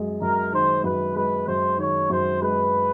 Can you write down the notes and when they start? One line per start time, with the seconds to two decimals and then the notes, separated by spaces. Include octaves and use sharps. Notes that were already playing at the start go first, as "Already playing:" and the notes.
Already playing: F#2 G#3
0.21 F#2 A#4
0.53 D#3 C5
0.84 F#2 B4
1.15 G#3 B4
1.47 F#2 C5
1.78 D#3 C#5
2.10 F#2 C5
2.41 G#3 B4